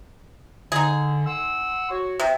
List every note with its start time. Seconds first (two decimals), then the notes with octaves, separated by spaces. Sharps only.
0.72 D3 D#4 G#4
1.26 F#5 C6 E6
1.91 F#4 C#5
2.20 C3